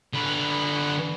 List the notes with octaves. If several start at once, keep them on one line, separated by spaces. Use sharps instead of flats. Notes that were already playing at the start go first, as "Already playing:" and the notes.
D3 B4